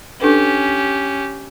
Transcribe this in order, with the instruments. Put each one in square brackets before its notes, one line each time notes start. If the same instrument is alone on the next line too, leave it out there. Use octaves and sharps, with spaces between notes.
[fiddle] C#4 G4 [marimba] D4 A4 B4